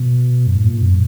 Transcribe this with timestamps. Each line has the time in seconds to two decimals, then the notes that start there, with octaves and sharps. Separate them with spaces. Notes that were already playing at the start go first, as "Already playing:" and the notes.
Already playing: B2
0.47 F#2
0.56 G#2
0.64 A#2
0.82 F#2